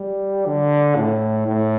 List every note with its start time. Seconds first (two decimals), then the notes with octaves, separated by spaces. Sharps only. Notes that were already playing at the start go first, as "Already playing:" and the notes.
Already playing: G3
0.46 D3
0.96 A2
1.48 A2